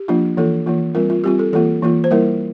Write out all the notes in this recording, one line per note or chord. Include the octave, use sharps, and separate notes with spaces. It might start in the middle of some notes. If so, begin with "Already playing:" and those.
Already playing: G4
F3 A#3 D4 F4
E3 A#3 F4 A4
E3 A#3 F4
G3 C4 F4 A#4
F4
G3 C4 F4 G4
A4
E3 A#3 F4 A4
E3 A#3 F4
C5
G3 A#3 E4 A#4